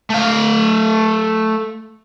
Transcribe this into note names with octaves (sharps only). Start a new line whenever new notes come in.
A3 F5